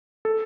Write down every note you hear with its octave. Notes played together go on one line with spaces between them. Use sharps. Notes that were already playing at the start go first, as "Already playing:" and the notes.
A4